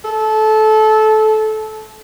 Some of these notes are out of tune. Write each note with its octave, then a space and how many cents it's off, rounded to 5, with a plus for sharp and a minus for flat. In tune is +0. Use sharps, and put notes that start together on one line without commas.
A4 -20